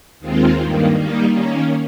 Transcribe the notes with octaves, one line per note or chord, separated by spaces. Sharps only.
D#2 D#3 G#3 C4 F4
G2 D#3 A#3
D#3 G3 A#3 D#4
D#3 A#3 C#4